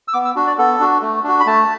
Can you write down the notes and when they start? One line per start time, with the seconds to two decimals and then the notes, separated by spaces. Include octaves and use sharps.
0.08 E6
0.13 B3 D6
0.25 E6
0.36 D4 F#4
0.47 D5
0.58 B3 A4
0.80 D4 F#4
1.02 A3
1.24 D4 F#4
1.40 B5
1.46 A3 A5